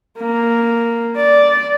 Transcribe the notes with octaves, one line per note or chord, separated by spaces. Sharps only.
A#3
D5